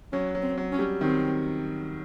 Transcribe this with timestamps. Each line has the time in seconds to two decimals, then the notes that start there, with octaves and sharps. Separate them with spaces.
0.13 F#3 C#4
0.35 F#3
0.42 C4
0.57 F#3
0.72 C#4
0.79 G3
1.01 D#3 C4